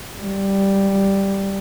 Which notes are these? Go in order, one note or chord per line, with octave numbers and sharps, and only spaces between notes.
G3